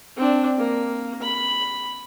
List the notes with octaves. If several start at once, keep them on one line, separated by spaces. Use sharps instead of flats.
C4 D4
A#3
B5